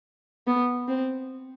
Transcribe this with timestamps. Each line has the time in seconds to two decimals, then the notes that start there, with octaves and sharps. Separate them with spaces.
0.47 B3
0.88 C4